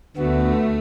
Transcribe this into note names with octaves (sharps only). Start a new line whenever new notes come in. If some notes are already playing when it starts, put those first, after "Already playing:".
D2 D3 A3 B3 F#4